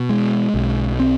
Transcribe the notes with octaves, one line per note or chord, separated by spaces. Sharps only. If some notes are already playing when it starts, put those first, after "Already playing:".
Already playing: B2
G#3
B1
C4